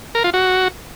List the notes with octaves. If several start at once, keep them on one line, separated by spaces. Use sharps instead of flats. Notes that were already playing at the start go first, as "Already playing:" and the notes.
A#4
F4
F#4